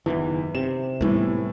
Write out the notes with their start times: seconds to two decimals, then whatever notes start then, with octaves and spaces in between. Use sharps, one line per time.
0.06 F#1 E2 D#3 E3
0.55 C3 E7
1.01 A2 E3 G3 A3 B3